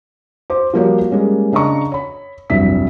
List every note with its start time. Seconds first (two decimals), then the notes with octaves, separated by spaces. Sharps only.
0.50 C5 D6
0.74 F3 G3 A#3 F#4 G4 C#5
1.12 G3 G#3 A#3 C#4
1.52 C#3 D4 D#5 A#5 C#6
1.92 C#5 B5
2.50 F1 C2 G2 F#3 E5 B6